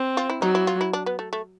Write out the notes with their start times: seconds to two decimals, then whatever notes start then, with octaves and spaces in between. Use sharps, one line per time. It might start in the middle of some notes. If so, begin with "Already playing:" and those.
Already playing: C4
0.17 F4
0.30 E4
0.41 F#3 D#4
0.55 E4
0.67 F4
0.81 E4
0.93 D4
1.06 B3
1.19 A3
1.33 A3